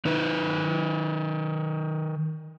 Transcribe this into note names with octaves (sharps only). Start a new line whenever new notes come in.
D#3 D#4 B4